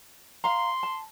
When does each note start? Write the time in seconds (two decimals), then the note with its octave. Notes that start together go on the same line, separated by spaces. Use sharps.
0.44 F5 A#5 C6
0.83 A5